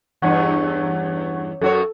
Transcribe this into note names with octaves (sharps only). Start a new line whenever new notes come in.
E2 G2 C#4 F#5 C#6 G#6
F#2 F#4 A4 C#5